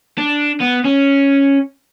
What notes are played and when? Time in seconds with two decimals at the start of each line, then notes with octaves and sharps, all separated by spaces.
0.18 D4
0.60 B3
0.84 C#4